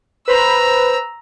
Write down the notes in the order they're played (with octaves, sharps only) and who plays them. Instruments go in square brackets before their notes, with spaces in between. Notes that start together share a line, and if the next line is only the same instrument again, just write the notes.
[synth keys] B4 C5 B5 [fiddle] A#5 E6